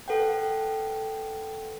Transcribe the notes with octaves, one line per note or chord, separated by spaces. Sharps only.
A4 B4 F#5 G5